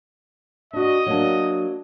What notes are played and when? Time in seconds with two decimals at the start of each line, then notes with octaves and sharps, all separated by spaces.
0.73 D4 F#4 D#5
1.06 F#3 A#3 D4